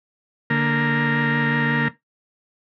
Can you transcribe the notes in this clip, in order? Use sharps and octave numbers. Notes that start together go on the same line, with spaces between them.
D3 A#3 A#4